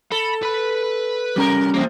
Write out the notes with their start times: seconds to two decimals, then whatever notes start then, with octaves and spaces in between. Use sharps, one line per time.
0.12 A4 B5
0.43 B4 B5
1.36 C3 G3 C#4 A#4 A#5
1.74 E2 C3 F3 A#3